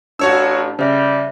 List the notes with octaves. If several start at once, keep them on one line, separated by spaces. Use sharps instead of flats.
A1 D4 F#4 C#5 A5 E6
C#3 G3 C5 E5